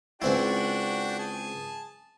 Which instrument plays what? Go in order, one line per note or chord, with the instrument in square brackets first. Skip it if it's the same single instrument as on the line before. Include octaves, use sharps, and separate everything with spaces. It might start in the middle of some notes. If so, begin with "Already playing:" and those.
[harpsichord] C#2 C4 E4 [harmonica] D4 F#4 G5
[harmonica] G#4 G#5 A5